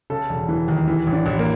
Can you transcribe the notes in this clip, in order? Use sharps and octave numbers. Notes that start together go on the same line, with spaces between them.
C#3 A4
E1
E3
D#2
E3
A1
D4
A1
A#3